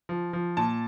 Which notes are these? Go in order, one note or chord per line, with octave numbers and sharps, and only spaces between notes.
F3
F3
A#2 A5